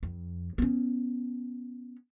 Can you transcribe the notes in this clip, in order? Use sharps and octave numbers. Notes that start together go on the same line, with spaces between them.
F2
B3 C#4